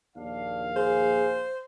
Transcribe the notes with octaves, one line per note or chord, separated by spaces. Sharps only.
A#1 D#2 D4 F5
G#4 C5